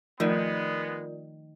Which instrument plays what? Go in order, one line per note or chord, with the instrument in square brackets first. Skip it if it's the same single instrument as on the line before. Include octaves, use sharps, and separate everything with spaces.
[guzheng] D#3 [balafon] F3 A3 [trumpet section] G#3 B3 [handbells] F4 A#4 D5